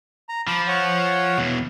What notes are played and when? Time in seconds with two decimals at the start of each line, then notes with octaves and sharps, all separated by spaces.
0.29 A#5
0.47 F3 B5 D6
0.68 C#5 F#5
1.38 E2 B2